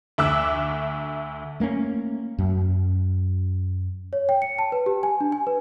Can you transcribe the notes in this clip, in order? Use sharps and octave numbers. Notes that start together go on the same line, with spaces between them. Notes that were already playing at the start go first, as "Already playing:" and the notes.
D2 E5 D6 E6 F#6
A3 A#3 C4 C#4
F#2
C#5
G5
C#7
A5
B4
G4
G#5
D4
G#5
B4